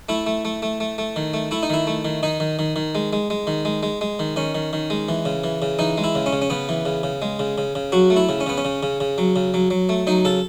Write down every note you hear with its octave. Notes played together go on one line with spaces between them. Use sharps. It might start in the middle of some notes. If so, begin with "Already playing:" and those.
A3 E4
A3
A3
A3
A3
A3
D#3
A3
A3 E4
D#4
D#3 E4
A3
D#3
D#3 D#4
D#3
D#3
D#3
G#3
G#3
G#3
D#3
G#3
G#3
G#3
D#3
D#3 C#4
D#3
D#3
G#3
E3
C#3
E3
C#3
E3 D#4
G#3
E4
C#3
C#4
C#3
C#4
C#3 B3
E3
C#3
C#3
G#3
C#3
C#3
C#3
F#3 F#4
A3
E4
C#3
C#4
C#3 B3
C#4
C#3
C#3
C#3
F#3
C#3
F#3
F#3
A3
F#3 D#4
C#3 A4